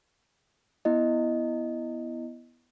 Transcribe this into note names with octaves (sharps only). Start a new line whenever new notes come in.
B3 E4 D#5